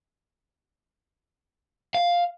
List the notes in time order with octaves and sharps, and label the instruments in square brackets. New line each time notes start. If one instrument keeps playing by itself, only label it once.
[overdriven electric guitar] F5